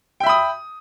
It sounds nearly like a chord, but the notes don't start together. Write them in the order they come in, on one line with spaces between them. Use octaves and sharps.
G5 E5 B5 D#6